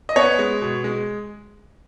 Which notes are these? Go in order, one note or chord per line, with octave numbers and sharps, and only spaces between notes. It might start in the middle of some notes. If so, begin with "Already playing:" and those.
D#5
B3 C#5
G#3
B2
G#3